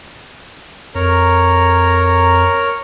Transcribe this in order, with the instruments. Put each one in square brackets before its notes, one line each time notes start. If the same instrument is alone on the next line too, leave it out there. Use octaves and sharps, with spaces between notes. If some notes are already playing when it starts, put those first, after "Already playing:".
[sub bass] F2 [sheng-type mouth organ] A#4 C#5 A#5